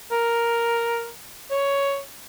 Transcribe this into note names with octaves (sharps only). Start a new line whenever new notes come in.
A#4
C#5